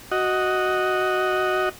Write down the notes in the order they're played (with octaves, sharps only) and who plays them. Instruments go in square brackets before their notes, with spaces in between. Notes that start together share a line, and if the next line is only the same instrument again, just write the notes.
[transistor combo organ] F#4 D#5